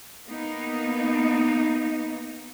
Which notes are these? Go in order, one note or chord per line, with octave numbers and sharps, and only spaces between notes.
A#3 B3 D#4